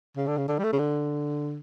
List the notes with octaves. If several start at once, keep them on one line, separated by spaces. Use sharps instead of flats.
C#3
D3
C#3
D3
G3
A3
C#3
D3